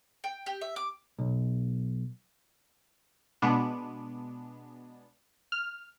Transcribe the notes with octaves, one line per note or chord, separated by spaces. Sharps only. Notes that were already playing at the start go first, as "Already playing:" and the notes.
G5
G4
E5
D6
B1
B2 G#3 B3 D4
F6